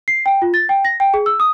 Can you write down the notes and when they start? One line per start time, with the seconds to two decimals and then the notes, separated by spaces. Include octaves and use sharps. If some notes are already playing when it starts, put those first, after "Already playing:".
0.08 C7
0.26 G5
0.42 F4
0.54 A6
0.69 G5
0.85 A#6
1.00 G5
1.14 G#4
1.26 E6
1.40 D#6